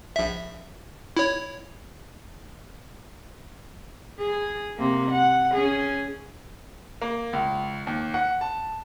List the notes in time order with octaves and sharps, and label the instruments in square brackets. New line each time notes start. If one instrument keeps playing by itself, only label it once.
[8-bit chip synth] A#1 E5
E4 C#5
[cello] G#4
C3 A#3
F#5
C#4 G#4
[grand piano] A#3
C#2
D#2
F#5
A5